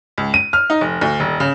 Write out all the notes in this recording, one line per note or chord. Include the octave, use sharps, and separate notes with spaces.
C#2
D#7
F6
D#4
F1
D2
D#1
C#3